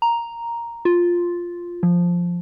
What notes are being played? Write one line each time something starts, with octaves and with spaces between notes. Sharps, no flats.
A#5
F4
F3